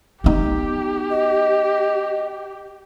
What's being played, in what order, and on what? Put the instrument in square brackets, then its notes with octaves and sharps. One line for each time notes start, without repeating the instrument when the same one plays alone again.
[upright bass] B3 D#4 [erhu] G4
[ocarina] D#5